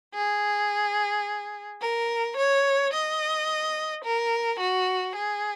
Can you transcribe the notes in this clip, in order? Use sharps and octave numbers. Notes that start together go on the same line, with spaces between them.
G#4
A#4
C#5
D#5
A#4
F#4
G#4